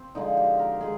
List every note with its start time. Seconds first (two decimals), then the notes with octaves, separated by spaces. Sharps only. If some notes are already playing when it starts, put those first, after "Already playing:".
Already playing: C4
0.15 D3 F3 G#3 D#4
0.37 G4
0.59 A#4
0.81 D#3 G#3 G#4